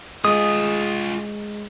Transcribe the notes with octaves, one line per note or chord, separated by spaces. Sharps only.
G#3 F4 G#4 D#6